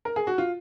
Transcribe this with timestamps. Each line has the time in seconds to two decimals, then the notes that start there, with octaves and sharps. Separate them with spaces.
0.05 A#4
0.16 G#4
0.27 F#4
0.38 F4